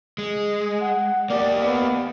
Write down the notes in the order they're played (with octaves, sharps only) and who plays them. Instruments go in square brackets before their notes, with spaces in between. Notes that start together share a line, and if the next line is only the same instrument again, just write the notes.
[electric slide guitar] G#3
[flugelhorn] F#5
[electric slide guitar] A#3 G4 [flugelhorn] D5
[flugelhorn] B3